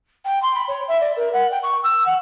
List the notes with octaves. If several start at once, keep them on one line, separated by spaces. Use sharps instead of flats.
G5
C6
B5
C#5
E5
D5
A#4
F#5
G5
C#6
E6
F#5